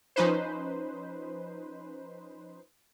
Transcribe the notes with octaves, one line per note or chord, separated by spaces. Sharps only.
F3 C#4 D#4 B4 C5